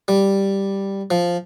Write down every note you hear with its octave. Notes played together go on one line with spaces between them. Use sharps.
G3
F3